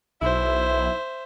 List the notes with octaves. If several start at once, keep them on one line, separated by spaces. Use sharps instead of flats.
B1 E4 C5 E5